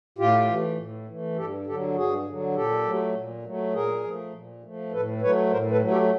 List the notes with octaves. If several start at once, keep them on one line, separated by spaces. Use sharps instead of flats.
A2 F4 G4
E3 A3
A2
E3 A3
G2 G4 A4
D3 F#3 G4 A4
G2 F#4 G#4
D3 F#3
A#2 G4 A4
F#3 A3
A#2
F#3 A3
A#2 G#4 A#4
F3 A3
A#2
F3 A3
A2 A4 B4
F#3 A3 B4 C#5
A2 A#4 C5
A4 B4
F#3 A3
G4 A4